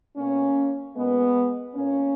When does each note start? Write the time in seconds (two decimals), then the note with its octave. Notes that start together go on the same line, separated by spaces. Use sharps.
0.16 B2 A#3 C#4
0.96 A#2 G#3 B3
1.75 A#2 A#3 C#4